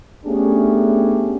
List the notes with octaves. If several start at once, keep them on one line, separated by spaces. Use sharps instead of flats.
A3 B3 C#4 D4 G4 G#4